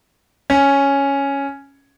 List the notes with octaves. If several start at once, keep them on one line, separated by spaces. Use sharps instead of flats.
C#4